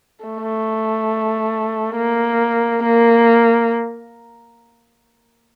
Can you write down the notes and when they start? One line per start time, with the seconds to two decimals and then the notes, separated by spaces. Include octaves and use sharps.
0.24 A3
1.97 A#3
2.83 A#3